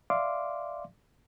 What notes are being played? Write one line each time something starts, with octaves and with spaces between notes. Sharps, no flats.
D5 E5 F5 C6 D6